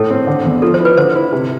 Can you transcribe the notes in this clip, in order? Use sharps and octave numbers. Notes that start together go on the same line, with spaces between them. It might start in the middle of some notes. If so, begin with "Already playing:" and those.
Already playing: A2 A4
C4
D3
E2
F3 A4
C5
E4
B4
D3 C5
E4
C3